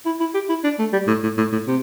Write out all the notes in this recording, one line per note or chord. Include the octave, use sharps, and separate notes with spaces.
E4
E4
G4
E4
D4
A3
G3
A2
A2
A2
A2
C3